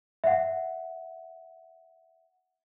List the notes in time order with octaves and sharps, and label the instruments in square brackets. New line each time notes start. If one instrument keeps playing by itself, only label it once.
[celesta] E5 F#5